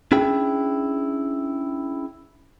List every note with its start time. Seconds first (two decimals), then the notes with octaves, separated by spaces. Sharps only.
0.12 C#4 D4 E4 G#4 G5